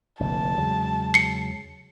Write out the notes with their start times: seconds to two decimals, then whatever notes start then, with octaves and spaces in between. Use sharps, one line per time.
0.20 F1 A#1 E2 A#2 D3 A5
0.58 E2 C#3 F#3 G#3
1.14 C7 C#7